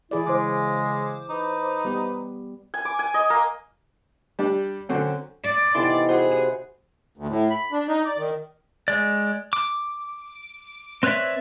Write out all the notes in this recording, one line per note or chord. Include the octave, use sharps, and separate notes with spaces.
E3 E4 G#4 D5
C#3 G#3 C5 D6
D#4 B4
G3 B3 G4
G#5
D6
G#5
D#5
A#3
G3 D4 G4
D3 F#3 C4 C#4
D5
C3 E3 B3 D#4 A4 C6
F#4 G#4 B4 C5 F#5
D2
A2
B5
D4
D#4
D5
D#3
G#3 D5
D6
C4 B4 C#5 D5 E5